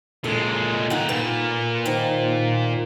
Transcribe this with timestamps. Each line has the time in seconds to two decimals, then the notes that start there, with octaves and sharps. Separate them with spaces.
0.24 A#2 G#3 A4
0.90 D#3 D#4 F4 F#5
1.09 A#2 A#3 B4
1.86 D#3 C5